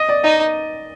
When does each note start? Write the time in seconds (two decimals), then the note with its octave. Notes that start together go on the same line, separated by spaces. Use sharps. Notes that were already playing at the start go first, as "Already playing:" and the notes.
Already playing: D#5
0.09 D5
0.24 D#4 D#5